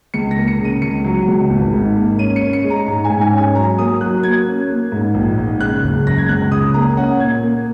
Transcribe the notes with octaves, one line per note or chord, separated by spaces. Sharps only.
C#2 C#7
A#6
A#3
C#7
C#3
D#7
C#2 C#7
F#3
C#2
G#1
G#2
A#3
C#4 D#7
C#7
C#4
C#7
G#3
A#5
G#2 A#5
G#5
G#2
G#5
C#4 G#5
F#3 A#5
A#3 D#6
F#3 F#6
A#3 G#6
C#4
A#3
G#2
A#1
G#2
C#3 F#6
F#1
F#2 A#6
G#6
C#2 F#6
C#3 D#6
A#3 A#5
C#4 F#5
A#2 G#6
A#3